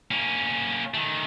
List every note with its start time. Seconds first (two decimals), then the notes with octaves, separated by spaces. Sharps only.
0.11 A#3 C#4
0.94 D#3 A3